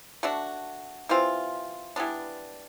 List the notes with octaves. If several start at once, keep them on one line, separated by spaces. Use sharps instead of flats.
A3 D4 F#4
E3 G3 C4 F4
E3 G3 B3 D4